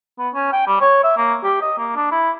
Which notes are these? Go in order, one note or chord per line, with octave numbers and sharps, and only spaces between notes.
B3
C#4
G5
G3
C#5
E5
A#3
G4
D#5
A#3
D4
E4